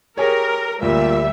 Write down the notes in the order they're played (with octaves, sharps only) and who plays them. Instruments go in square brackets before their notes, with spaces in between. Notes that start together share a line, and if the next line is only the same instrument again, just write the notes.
[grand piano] G4 G#4 C#5 [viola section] A#4
[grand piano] D2 [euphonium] A#2 [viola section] G3 E5